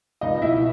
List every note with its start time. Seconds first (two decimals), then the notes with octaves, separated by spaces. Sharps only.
0.21 C#2 D#4 D#5
0.42 B2 E4 E5